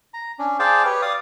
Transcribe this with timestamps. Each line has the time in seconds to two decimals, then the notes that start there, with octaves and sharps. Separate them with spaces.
0.14 A#5
0.39 C#4 D4
0.59 G#4 C5 D5 F5 G5 A5
0.85 G4 B4 C#5
1.02 D5 F5 D#6